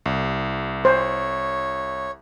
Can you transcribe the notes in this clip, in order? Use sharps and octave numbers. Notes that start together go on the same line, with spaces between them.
C2
C5 C#5